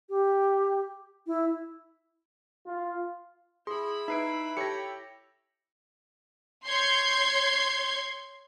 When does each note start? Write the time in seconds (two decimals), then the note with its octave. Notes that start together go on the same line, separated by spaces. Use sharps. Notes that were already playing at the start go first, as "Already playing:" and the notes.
0.09 G4
1.27 E4
2.67 F4
3.67 E4 G#4 B5 C6
4.08 D#4 B4 E5 C7 D7
4.57 G4 A4 C#5 A#6 C#7
6.67 C#5 C6 G6 G#6 C7